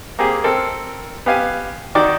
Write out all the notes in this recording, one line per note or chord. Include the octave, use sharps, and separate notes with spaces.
A#3 C4 G4 G#4
C4 A4 A#4
B3 G4 F5 G#5
D#3 F#4 D5 D6